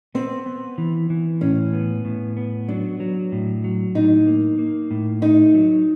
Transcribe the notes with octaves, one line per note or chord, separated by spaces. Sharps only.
B3 C4
B3
E3
E3
A2 C#4
B3
A2
B3
F#3 D4
F#3
A2
F#3
A2 D#4
A#3
A#3
A2
A3 D#4
F#3